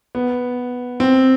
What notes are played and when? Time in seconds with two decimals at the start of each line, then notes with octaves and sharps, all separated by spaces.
0.15 B3
1.00 C4